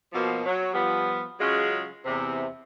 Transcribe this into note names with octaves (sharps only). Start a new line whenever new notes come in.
B2 F3 A#3
F#3
F3 G3 B3
C#3 F#3 G#3 C#4 F4 G#4
E2 C3